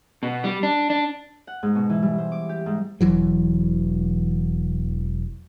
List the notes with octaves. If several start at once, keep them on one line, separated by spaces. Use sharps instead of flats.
B2
G3
D4
D4
F#5
G#2
B2
E3
G3
C5
D6
G4
G#2
E1 E3 F#3